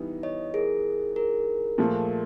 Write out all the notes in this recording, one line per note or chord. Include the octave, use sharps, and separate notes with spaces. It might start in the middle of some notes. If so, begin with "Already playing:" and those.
Already playing: E3 G3 B3 D#4
C#5 D#5
G#4 A#4
G#4 A#4
A#2 F3 A3